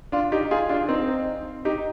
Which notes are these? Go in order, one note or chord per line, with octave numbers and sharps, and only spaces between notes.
D4 F4
D#4 G4
F4 G#4
D4 F4
C4 D#4
D#4 G4